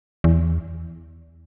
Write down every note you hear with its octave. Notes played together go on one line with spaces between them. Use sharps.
E2